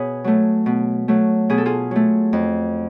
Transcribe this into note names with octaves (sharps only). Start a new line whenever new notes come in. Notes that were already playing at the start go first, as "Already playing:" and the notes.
Already playing: B2 G#4 B4 C#5
F#3 A3
B2
F#3 A3
B2 G#4
A4
F4 G#4
F#3 A3
F2